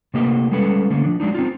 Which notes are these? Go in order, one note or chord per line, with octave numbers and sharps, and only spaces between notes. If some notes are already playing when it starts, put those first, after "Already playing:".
C3 A3 A#3 G4 D#5
G3 G#3 C#4 A4 B4
D3 A3 A#3 C#4
F3 D4
F#3 G#3 D4 D#4
C4 D#4 F4